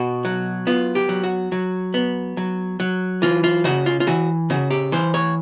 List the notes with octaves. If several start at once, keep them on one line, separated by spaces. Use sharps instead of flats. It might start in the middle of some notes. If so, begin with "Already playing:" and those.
Already playing: B2 F#4
F#3
B3 F4
G4
F#3
F#4
F#3
B3
F#3
F#3
E3 F4
F4
C#3 F#4
F4
F4
E3 F#4
C#3 F#4
G4
E3 C5
C#5